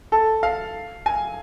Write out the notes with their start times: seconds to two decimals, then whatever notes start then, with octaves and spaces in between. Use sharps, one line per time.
0.12 A4
0.43 F5
1.06 G#5